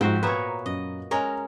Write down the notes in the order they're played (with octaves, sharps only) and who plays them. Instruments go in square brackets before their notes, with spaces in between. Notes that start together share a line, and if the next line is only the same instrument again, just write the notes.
[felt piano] G#2 F3 [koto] C4 [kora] F#4 C5 G5
[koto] A#2 B3 E5 [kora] B4 C#5 [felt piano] A#5
[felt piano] F#2 [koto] D#5
[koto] G#3 C#4 A#4 [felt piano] A#5